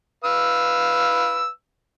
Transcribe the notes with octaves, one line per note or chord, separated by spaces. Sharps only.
B4 F5 E6